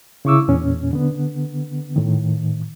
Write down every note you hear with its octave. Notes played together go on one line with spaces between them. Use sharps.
C#3 E4 C#6 D6 E6
E2 A#2 C#4
D3 B3
A2 D#3